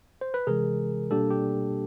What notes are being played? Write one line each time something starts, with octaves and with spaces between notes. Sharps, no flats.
C5
B4
C3 E3 G#3 G#4 A#4
B2 G3 A#3 D4 G4 A4
G4